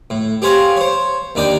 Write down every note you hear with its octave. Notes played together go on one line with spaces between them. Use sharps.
A2
G4 G#4 C5 C#5 F5
C5 C#5
D#2 D4 D#4 D5 G5